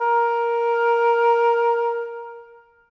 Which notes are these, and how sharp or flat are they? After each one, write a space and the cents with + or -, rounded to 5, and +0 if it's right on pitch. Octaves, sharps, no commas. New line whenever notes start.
A#4 +10